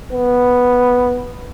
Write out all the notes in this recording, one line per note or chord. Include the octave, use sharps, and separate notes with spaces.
B3